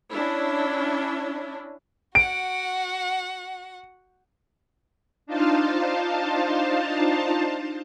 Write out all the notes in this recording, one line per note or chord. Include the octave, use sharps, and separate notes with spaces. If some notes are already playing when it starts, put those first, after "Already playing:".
C#4 D4 E4
F#4 F#5 D7
D4 D#4 F4 C5 F5 A5